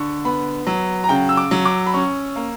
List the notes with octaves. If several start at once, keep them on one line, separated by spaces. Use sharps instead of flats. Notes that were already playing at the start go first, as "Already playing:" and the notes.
Already playing: D3 C#6
B3 B5
F#3
A#5
C#3 G5
E6
D6
F#3
D6
B5
C#4 C#6
A#3